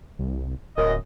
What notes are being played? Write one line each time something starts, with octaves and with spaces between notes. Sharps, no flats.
C2
D1 F#2 D#5